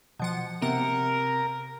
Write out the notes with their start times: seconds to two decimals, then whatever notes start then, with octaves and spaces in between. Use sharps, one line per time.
0.20 B2 F3 F#5
0.62 C3 A#4 F#5